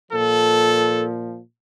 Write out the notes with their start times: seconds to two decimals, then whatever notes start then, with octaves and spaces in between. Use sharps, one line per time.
0.11 A#2 F3 A4